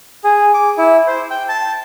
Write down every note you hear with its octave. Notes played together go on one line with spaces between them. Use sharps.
G#4
D6
E4
C5
G5
A5